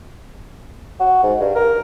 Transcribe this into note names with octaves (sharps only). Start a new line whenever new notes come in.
F#4
G#2
G2
A#4